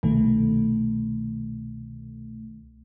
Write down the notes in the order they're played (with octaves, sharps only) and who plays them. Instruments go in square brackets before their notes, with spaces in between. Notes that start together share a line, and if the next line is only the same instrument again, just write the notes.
[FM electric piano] C2 B2 D#3 A3